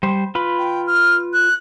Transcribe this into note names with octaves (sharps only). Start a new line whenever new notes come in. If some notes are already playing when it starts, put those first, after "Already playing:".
G3 C5
F4 B4 B5
G5
F6
F#6